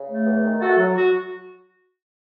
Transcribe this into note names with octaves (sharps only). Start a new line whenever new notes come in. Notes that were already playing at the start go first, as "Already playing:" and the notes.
Already playing: C#3
A3
E2
D#3
A3 F#4 A4
F#3
F#4